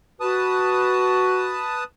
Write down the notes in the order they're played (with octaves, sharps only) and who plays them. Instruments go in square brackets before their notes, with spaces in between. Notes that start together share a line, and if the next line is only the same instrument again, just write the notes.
[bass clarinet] F#4 [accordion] B4 A5 D#6